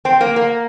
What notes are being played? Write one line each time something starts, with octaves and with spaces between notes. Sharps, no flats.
C4
A#3
A#3